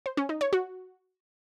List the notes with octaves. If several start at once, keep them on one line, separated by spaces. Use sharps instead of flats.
C5
C#4
D#4
C#5
F#4